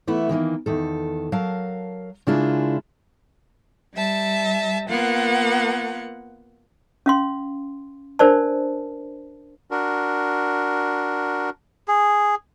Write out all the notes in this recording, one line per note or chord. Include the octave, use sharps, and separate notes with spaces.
E3 A3 B3 E4
D#3 E3 G3 A#3
E2 D#3 A4
F#3 A#4 F5 A5
C#3 G#3 A#3 D4 E4 F4
G3 E5 A5
A#3 B3 F4 F#5
C#4 F5 C6
D4 A#4 C5 D5 A5
D4 F#4 A#4
G#4